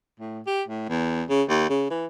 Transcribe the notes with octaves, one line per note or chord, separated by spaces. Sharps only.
A2
G4
A2
E2
C#3
D#2
C#3
E3